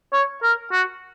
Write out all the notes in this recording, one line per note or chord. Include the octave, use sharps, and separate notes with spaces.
C#5
A#4
F#4